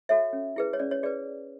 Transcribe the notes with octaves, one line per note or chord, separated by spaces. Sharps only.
F#4 A4 C#5 E5
C#4
E4 G#4 B4
C#5
C#4 D5
C#5
G#4 B4 D5